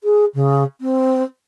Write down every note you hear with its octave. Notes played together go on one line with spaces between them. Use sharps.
G#4
C#3
C4